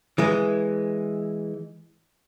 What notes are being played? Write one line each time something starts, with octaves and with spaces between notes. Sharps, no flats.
E3 G#3